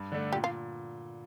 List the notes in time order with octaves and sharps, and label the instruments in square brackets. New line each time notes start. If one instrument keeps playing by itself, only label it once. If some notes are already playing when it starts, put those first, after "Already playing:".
Already playing: [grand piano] G2
D3 A3 D4
[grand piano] A#2 [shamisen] G4
[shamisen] F4